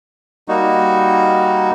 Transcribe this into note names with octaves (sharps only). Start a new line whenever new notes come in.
G3 A#3 D#4 F#4